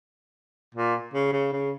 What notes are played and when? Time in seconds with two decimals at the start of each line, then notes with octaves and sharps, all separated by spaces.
0.75 A#2
1.13 C#3
1.32 C#3
1.52 C#3